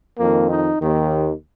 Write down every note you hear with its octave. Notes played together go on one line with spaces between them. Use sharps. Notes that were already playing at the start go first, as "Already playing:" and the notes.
F2 D#3 A#3
D#4
D#2 D#3